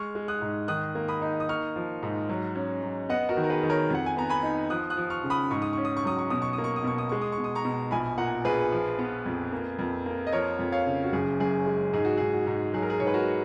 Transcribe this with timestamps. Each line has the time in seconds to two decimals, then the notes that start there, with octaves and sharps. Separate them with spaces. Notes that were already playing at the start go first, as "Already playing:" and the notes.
Already playing: G#3 C#6 F6
0.15 G#3
0.28 D#6 F#6
0.42 G#2
0.68 D#3 D#6 F#6
0.95 A#3
1.08 B5 D#6
1.22 D#4
1.40 D#6
1.49 A#3 C#6 F6
1.76 F3
2.03 G#2
2.29 F#3
2.55 C#4
2.83 F#3
3.09 B3 D#5 F#5
3.29 F#4 A#4
3.37 D#3
3.43 A#4
3.50 G#4 B4
3.63 D#3
3.70 A#4 C#5
3.90 F2 F#5
4.06 G#5
4.17 B3 A#5
4.29 G#5 B5
4.43 D#4
4.70 F3 D#6 F#6
4.90 D#6 F#6
4.97 F3
5.10 C#6 F6
5.24 C#3
5.30 B5 D#6
5.51 G#2 C#6
5.62 D#6
5.73 C#4 C#6
5.85 D#6
5.97 C#6
6.04 F#3 D#6
6.19 C#6
6.30 B2 D#6
6.42 C#6
6.53 D#6
6.58 A#3
6.64 C#6
6.76 D#6
6.84 B2 C#6
6.98 D#6
7.09 G#3 C#6
7.22 D#6
7.32 C#6
7.38 B2
7.44 D#6
7.55 A#5 C#6
7.65 B2
7.91 A#1 G#5 B5
8.18 A#2 F#5 A#5
8.44 A#1 G#4 B4
8.72 F3
8.99 B3
9.26 F2
9.52 A#3
9.79 F2
10.06 A#3
10.27 D#5
10.32 F3 A#4 C#5
10.59 F2
10.72 C#5 F5
10.86 C#3
11.04 F#4
11.12 F#1 G#4
11.40 F#2 G#4
11.66 G#3
11.93 G#2 G#4
12.05 F#4
12.17 G#2 G#4
12.33 F#4
12.47 G#2
12.74 F#3 G#4
12.82 A#4
12.90 G#4
13.00 G#2 C#5
13.07 B4
13.14 F#4 A#4